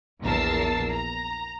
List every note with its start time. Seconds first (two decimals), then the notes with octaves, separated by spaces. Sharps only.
0.23 A#1 E2 A#4 A5 E6 C7
0.91 A#5